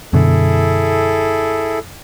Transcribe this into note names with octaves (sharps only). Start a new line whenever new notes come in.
F#2 B2 D3 E4 G#4 A4